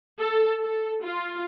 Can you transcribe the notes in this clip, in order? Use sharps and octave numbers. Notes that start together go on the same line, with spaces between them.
A4
A4
F4